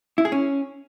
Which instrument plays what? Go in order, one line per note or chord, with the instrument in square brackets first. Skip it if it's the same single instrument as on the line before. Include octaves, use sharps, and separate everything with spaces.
[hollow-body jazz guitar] E4
G#4
C#4